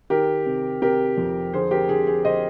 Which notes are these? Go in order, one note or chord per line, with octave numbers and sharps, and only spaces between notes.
D#3 G4 A#4
C3
C3 G4 A#4
F2
D3 G#4 C5
G4 A#4
D3 G#4
G#4
D3 C5 D#5